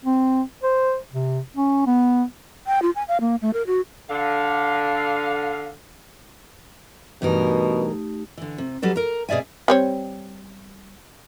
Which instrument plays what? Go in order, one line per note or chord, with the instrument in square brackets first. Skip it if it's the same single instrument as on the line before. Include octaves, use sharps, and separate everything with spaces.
[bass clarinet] C4
C5
C3
C#4
B3
[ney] G5
F4
G#5
F5
A#3
A3
A#4
F#4
[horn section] D3 F5
[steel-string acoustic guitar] G2 E3 A#4 [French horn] B2 [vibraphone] A3 D#4 G4
[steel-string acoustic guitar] D3 E3
C3
F#3 G3 A4 B4
A#4 A#5
B2 G#4 D5 E5 G#5
[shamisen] G3 C4 C#5